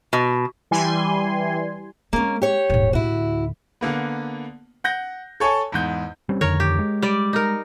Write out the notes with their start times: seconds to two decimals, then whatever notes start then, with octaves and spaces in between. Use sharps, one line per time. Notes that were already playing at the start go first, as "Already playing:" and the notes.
0.13 B2
0.71 E3 G3 G#5 C6
2.13 G#3 A#3 C4 C#4
2.42 G4 C#5
2.70 D#1 G#2
2.93 D2 A2 E4 F#4
3.81 D3 A#3 B3
4.84 F#5 G6 A#6
5.40 A4 C#5 G#5 A5 C#6
5.72 E2 G#2 G6
6.29 G3 C4 C#4
6.41 F2 D3 D#3 A#4 C#5
6.60 G4
6.79 G#3
7.02 G3 D5
7.33 D#4 A#4